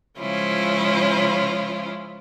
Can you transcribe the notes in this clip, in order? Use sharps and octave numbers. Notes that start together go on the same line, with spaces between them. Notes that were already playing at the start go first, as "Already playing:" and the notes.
C#3 F3 G#3 C#4 E4 F4